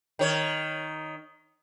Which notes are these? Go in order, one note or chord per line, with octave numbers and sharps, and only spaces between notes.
D#3 C#5